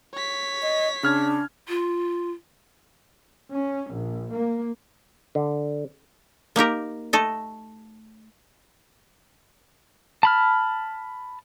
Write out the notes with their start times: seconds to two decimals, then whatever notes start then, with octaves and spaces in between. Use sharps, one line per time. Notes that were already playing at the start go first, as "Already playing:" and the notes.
0.14 C#5 B6
0.62 D#5
1.03 C#3 D4 F6 G#6
1.69 F4
3.52 C#4
3.92 A#1
4.33 A#3
5.35 D3
6.56 A#3 D#4 G4 A#4
7.13 A3 A4 D#5
10.23 A5 B5 F6